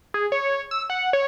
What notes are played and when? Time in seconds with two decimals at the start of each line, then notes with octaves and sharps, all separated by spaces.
0.14 G#4
0.32 C#5
0.71 E6
0.90 F#5
1.13 C#5